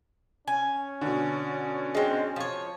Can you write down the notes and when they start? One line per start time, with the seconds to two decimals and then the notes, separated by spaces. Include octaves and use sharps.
0.48 C#4 G#5
1.01 B2 D3
1.95 G#3 C4
2.36 F3 C#5